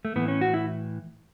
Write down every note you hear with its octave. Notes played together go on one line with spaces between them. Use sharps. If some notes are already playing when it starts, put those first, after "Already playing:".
A3
A2 E3 B3
C#4
F#4
E4